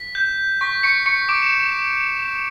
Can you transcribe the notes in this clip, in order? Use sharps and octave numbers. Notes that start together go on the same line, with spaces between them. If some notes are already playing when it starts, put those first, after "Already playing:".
Already playing: B6
G6
C#6 B6
C#6 C#7
C#6 C#7
D6 D7
E7